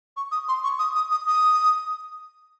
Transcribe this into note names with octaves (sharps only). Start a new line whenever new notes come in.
C#6
D#6
C6
C#6
D#6
D#6
D#6
D#6